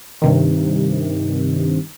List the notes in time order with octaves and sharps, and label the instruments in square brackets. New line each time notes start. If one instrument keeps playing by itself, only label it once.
[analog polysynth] G2 C3 D#3